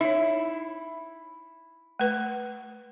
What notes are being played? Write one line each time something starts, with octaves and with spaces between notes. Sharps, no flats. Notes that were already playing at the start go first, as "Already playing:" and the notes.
D#4 E4 C#5
A3 B4